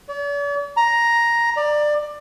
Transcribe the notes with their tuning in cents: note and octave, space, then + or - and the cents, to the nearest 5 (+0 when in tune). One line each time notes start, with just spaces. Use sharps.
D5 -45
A#5 +5
D5 +20